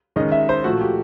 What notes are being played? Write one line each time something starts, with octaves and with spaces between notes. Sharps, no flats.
D#3 G#3 C#4 D#5
E5
C5
A#2 F3 A3 F#4
G4